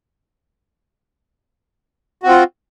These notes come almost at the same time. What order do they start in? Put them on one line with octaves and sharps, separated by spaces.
F#4 C4 F4